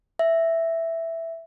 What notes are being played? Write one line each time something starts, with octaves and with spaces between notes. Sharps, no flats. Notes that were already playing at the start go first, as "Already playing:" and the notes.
E5